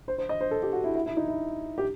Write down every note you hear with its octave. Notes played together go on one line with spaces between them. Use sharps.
C5
C5
D#5
C5
A4
G4
F#4
E4
E4
E4
D#4
E4
G4